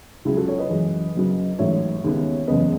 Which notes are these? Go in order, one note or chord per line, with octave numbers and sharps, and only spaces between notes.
C#2 C#3 F#3 E4 G#4
F#4 A4
A4 C#5
B4 D#5
F#2 E3 G#3
F#1 F#2 C#3 F#3
A1 G#2 F#3 A3 C#5 E5
D#2 C#3 G#3 B3
F#1 E2 C#3 G#3 B3 B4 D#5